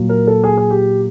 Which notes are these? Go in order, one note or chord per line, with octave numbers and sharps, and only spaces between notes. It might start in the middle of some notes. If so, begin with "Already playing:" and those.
Already playing: A#2 F#3
A#4
A4
G#4
G#4
G4